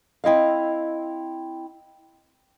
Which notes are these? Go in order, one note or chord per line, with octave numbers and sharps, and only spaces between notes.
C4 E4 D#5 F5